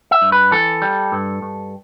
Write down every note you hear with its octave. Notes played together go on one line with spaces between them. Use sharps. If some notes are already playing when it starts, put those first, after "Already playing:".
E5
G2
B4
E3 A4
G3
G2
G2